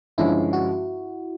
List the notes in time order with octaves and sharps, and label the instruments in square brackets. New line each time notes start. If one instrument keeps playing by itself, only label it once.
[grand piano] G2 D3 F3 G#3 C#4 [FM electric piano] E4
[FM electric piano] F#4